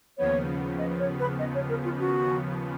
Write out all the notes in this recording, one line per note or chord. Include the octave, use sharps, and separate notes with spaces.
D#2 C#3 F3 B3 C#5
D#5
C#5
B4
D#5
C#5
A#4
F4
F#4